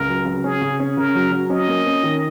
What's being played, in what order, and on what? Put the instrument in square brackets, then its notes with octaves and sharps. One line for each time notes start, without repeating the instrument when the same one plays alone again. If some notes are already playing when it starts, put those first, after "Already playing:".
Already playing: [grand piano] C#2 [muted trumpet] A#4
[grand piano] F#3
C#3
[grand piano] C#4 [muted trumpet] G#4
[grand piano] C#3
C#4
[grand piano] C#3 [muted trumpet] A#4
[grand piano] F#3
F#3
[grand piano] C#4 [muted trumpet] D#5
[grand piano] A#3
C#4
D#3